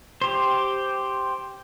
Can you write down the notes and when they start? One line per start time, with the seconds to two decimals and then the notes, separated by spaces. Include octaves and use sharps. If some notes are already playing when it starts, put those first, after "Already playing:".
0.22 G4 C5